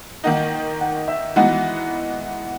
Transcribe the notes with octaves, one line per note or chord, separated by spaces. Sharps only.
D#3 A#3 D#4 F#5
F#5
E5
E3 G#3 B3 D#4 F#4 F#5